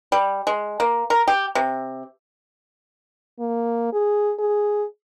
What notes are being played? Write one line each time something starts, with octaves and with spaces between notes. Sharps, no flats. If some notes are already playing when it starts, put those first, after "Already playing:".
G3
G#3
A#3
A#4
G4
C3
A#3
G#4
G#4